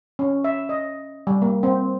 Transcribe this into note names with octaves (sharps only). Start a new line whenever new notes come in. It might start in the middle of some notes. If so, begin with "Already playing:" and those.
C#4
E5
D#5
G3
A#3
C4